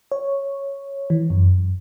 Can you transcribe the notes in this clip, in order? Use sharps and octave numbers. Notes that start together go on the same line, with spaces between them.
C#5
E3
F#2